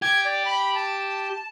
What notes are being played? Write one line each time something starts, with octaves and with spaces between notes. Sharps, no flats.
G4 G#6
D5
B5
A5